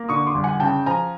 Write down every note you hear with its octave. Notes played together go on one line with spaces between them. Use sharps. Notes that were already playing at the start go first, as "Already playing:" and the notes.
Already playing: A#3
D3 C#6 D#6
C6 D6
G1
F#5 G#5
C#3 G5 A5
F3 G#5 A#5